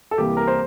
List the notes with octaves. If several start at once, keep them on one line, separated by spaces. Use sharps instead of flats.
A4
C2 C3 E3 A#3 G4
A#4
C5